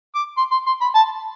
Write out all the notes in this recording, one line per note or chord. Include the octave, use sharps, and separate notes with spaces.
D6
C6
C6
C6
B5
A5